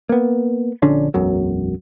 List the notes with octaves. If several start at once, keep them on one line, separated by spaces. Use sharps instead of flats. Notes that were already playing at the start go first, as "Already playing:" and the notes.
A#3 B3
A#1 D3 C#4 D4
E1 B1 F#2 F#3